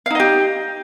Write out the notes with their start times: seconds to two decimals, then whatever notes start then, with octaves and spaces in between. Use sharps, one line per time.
0.06 F5
0.11 D#4
0.15 D#5
0.20 G4